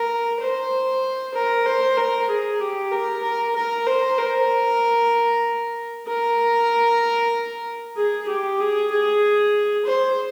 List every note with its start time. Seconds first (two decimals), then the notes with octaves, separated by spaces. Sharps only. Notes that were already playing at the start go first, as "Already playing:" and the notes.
Already playing: A#4
0.41 C5
1.34 A#4
1.65 C5
1.97 A#4
2.29 G#4
2.60 G4
2.92 A#4
3.23 A#4
3.56 A#4
3.87 C5
4.19 A#4
6.07 A#4
7.96 G#4
8.29 G4
8.60 G#4
8.91 G#4
9.86 C5